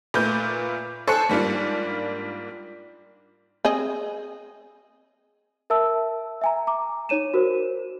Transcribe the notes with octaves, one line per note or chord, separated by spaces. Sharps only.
A#2 A3 F4 B4 G6
A4 C5 G#5 C#6 F#6 C#7
G#2 G3 A#3 D4 F4
C4 G#4 D#5
A#4 E5 A5 E6
E5 G#5 A#5
A#5 D6
D#4 C#5 D#7 E7
F#4 A#4 C5